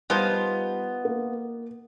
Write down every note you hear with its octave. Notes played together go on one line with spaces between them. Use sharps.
D#3 F3 G3 B3 F4
A#3